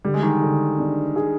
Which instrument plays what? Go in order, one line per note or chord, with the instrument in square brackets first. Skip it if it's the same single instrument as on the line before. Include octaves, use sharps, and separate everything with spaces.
[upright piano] D3 [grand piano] G3
[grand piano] G#3
D#3 G3
[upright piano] D3
D4
G#4